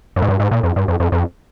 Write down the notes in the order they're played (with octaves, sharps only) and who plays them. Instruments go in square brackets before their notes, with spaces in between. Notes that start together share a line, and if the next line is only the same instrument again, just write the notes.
[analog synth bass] F#2
G#2
G2
G#2
A#2
F2
G2
F2
F2
F2